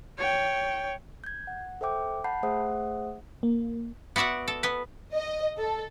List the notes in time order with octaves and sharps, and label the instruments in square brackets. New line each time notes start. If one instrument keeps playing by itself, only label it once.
[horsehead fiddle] C#5 G5
[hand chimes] G6 G#6
F#5
A4 C5 E5 G5 D6 G6
F#5 A5 B5 G6 C7
A3 G#4 C5 E5 F#5 D#6
[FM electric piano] A#3
[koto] B3 F#4 D5 E5 F#5
A4
B3 B4
[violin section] D#5
A4